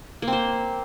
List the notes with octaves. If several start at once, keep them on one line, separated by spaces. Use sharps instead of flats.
A#3
C4
C5